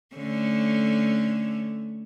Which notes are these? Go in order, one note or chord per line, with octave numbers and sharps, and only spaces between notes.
D3 A3 C#4